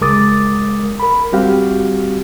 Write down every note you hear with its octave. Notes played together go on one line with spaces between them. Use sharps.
C#2 G#3 A#4 D6 D#6 A6
A#4 B5
G3 C4 F#4 G4 F5